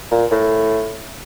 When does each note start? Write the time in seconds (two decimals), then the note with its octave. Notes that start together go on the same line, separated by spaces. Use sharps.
0.11 A#2
0.31 A2